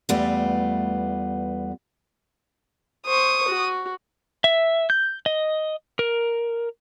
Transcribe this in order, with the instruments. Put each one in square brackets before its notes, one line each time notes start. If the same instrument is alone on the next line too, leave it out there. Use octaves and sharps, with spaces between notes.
[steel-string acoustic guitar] E2 G3 A3 B3 F4
[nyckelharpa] C5 C#6 [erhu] D#6
[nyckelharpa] F#4
[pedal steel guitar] E5
G6
D#5
A#4